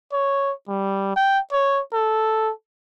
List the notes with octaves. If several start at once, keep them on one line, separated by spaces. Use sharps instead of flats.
C#5
G3
G5
C#5
A4